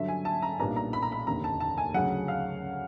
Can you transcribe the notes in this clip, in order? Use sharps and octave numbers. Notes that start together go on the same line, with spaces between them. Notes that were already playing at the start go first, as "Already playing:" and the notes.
Already playing: G2 D3 F#3 E5
G#5
A5
A#5
B1 A#2 G3 B3 D4 A#5
A#5
B5
A#5
B5
F1 D#2 D3 A#5
A5
A5
G#5
D2 C#3 F#3 F#5
F5